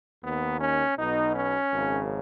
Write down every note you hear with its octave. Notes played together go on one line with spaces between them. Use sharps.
D#2 D#3 B3
C#4
B1 B2 D#4
C#4
G#1 F#2 C#3